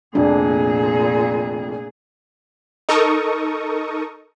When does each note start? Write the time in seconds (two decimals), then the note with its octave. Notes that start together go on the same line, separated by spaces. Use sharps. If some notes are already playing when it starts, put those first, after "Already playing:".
0.15 F1 A#1 F2 A#2 D4 G#4
2.89 D#4 A4 A#4 C#6 D#6